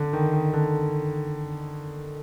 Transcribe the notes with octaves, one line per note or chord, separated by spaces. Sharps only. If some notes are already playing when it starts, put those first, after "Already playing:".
Already playing: D3
D#3
D#3
D3